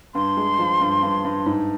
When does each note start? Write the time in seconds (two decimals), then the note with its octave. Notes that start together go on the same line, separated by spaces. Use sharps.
0.15 G2 C6
0.37 G#3
0.59 F3
0.81 G2
1.03 G2
1.25 G2
1.46 G#2